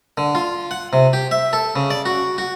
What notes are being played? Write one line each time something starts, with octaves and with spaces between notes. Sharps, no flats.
D3
F4
F#5
C3
G4
E5
A4
C#3
D5
F#4
F#4